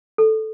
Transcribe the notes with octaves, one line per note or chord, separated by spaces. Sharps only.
A4